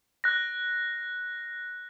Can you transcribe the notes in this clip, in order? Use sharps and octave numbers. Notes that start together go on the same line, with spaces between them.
F#6 A#6